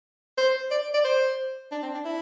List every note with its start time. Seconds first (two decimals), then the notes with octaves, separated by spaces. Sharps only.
0.38 C5
0.71 D5
0.94 D5
1.05 C5
1.72 D4
1.83 C4
1.94 D4
2.05 E4